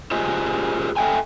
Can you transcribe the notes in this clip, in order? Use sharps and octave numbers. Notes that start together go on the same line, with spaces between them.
F4 G4 G#4 C5 D#5
A4 D#5 E5 G5 G#5